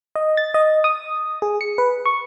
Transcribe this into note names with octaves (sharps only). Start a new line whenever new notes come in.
D#5
A6
D#5
D#6
G#4
C#7
B4
C#6